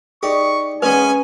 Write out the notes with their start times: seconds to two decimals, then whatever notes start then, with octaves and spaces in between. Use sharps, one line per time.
0.23 D#4 G4 G#4 D5 C#6
0.82 G#3 B3 C#4 B4 G#5